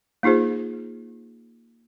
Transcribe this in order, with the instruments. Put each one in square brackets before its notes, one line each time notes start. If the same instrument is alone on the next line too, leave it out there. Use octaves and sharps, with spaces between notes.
[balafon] A#3 D#4 F4 G#4 C5